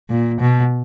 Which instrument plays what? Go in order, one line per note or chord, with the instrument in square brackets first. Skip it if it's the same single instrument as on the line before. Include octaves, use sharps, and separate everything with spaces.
[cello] A#2
B2